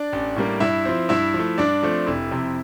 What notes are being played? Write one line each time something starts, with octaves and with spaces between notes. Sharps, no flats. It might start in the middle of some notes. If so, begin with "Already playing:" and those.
Already playing: D4 D5
A1
A2 G3 A#3
G2 E4 E5
F3 C4
G2 E4 E5
F3 A3
G2 D4 D5
F3 A3 C4
F1 E4
F2 C3